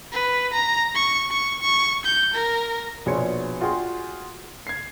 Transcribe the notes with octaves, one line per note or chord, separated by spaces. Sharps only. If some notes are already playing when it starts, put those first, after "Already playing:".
B4
A#5
C#6
C#6
C#6
G6
A#4
A#1 B2 G#4 C#5 C6 C#7
F4 F#4 G#4 G5 C6
G#6 C7